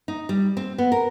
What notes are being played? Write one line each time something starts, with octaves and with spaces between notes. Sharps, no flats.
D#4
G3
C4
B3
A#4